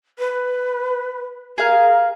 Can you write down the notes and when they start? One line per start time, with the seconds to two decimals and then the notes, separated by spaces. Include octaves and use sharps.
0.19 B4
1.58 G#4 A#4 F5